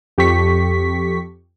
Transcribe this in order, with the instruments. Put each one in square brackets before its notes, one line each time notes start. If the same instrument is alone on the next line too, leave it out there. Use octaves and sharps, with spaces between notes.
[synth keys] F2 G4 A4 C#6 B6